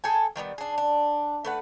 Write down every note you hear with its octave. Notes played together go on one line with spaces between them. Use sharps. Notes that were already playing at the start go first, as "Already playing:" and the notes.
G#4 A4 G5 G#5
D#3 G3 G#3 B3
D4 G#4
D4
A3 B4 F#5